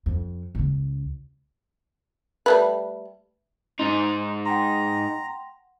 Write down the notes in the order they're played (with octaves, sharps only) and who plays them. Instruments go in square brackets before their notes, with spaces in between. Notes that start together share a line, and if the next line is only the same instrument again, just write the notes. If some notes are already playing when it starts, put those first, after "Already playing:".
[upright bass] F2
C#2 C#3
[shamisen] G3 A3 B4
[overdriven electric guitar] G#2 D#4 [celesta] C6
[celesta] F#5 G5 C6 [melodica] A#5